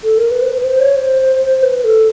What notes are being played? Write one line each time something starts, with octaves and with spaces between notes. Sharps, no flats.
A4
A#4
B4
C5
B4
C5
C#5
C5
B4
A4